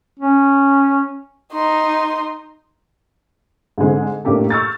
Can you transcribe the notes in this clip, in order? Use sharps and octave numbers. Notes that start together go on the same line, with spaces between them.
C#4
D#4 C6
G#2 D3 G#3 C4
A2 A#3 D4 G4 A4
C#6 E6 F6 G6 A6